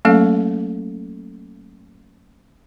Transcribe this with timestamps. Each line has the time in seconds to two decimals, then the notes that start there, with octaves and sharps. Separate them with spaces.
0.05 F#3 A3 A#3 C#4 A4 F5